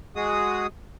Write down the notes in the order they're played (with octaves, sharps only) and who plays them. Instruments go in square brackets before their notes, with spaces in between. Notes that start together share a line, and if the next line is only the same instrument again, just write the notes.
[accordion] G#3 F#4 G#4 D#6